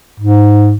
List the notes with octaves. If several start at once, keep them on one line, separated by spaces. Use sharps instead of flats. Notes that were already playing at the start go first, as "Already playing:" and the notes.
G#2